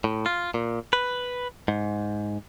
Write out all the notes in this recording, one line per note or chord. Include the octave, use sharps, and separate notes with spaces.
A2
F4
A#2
B4
G#2